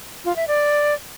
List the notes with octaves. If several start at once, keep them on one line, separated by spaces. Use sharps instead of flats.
F4
E5
D5